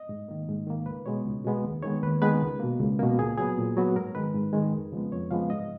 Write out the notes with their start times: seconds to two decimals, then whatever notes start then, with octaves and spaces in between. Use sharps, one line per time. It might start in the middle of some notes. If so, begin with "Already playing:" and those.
Already playing: D#5
0.09 G#2
0.28 D#3 A#3
0.48 G#2
0.67 D#3 A#3
0.86 C#2 B4
1.06 B2 G#3 B3 C#5
1.25 C#2
1.44 B2 G#3 B3
1.64 D#2
1.83 D#3 G#3 B3 C#5
2.03 D#2 B4
2.22 D#3 G#3 B3 B4
2.42 C#2
2.60 B2 A#3
2.79 C#2
2.99 B2 A#3
3.18 A#2 G#4
3.38 F#3 B3 G#4
3.58 A#2
3.77 F#3 B3
3.96 G#2 A#4
4.15 D#3 G#3 B4
4.35 G#2
4.53 D#3 G#3
4.73 F2
4.92 C#3 F3 G#3 B3
5.12 F2 C#5
5.31 C#3 F3 G#3 B3 F5
5.50 G#2 D#5